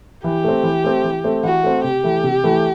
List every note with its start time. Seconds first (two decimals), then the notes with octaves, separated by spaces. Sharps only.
0.24 E3 G4
0.44 A3 C4
0.63 E3
0.84 A3 C4
1.04 E3
1.24 A3 C4
1.43 E3 F#4
1.64 A3 C4
1.84 C3 G4
2.03 E3 A3
2.23 C3
2.44 E3 A3